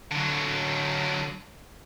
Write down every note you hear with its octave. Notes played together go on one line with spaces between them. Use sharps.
D3 F#3